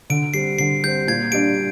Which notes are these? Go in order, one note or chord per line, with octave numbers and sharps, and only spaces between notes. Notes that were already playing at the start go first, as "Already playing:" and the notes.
D3 D7
G3 C4 C7
D3 C7
G3 C4 G6
A#2 G#6
G3 D4 D7